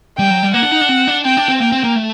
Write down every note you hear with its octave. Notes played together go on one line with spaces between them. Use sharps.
G3 G5
F#3
G3
A#3 F#5
D4
D#4
D4
C4
D4
C4 G5
D4
C4
A#3 G5
C4
A#3
A3